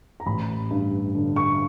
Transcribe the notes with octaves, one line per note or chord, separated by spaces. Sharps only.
A#5
A1 B5
G2
D3
C#6